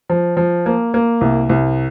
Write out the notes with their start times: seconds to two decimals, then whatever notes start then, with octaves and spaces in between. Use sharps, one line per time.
0.10 F3
0.37 F3
0.66 A#3
0.94 A#3
1.21 C2
1.49 C2